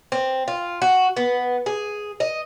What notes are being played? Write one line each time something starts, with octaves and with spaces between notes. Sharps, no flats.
C4
F4
F#4
B3
G#4
D#5